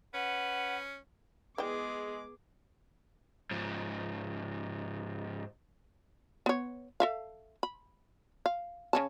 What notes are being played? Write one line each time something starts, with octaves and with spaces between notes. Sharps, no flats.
C#4 B4 F#5
E3 G#3 B3 G#4 D5 G5 D6
G#2 F3
B3 C#5
A4 E5 F5
B5
F5
C#3 C#4 A5